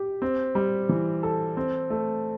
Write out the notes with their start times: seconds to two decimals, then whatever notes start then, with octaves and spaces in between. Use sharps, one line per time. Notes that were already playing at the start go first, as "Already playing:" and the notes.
Already playing: G4
0.22 C4
0.55 G3
0.89 E3
1.23 A4
1.57 C4
1.90 A3